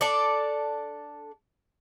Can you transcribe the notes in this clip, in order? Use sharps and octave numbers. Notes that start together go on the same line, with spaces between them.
D4 A4 D5